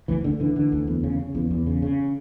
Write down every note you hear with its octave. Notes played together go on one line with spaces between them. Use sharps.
D2 E3
D2 D3
D3 E3
D3
D2
E2
C#3
C#3
E2
E2
C#3
C#3